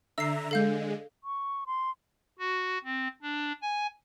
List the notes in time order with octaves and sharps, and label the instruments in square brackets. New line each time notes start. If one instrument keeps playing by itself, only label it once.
[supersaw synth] D3 E5 A#5 [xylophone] E6 C7
[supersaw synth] D3 G#3 [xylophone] A4 F5 G6
[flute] C#6
C6
[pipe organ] F#4
C4
D4
G#5